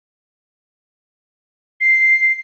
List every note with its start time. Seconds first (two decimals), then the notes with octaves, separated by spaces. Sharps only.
1.81 C7